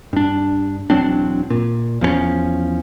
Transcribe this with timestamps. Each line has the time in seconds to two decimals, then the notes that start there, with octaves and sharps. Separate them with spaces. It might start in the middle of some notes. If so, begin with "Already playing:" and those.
0.13 G2 D4
0.90 E1 F#3 C4 D4
1.50 A#2
2.01 E2 F3 G3 C#4